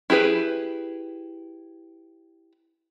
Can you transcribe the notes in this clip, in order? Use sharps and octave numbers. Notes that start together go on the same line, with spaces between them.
E4 G4 G#4 B4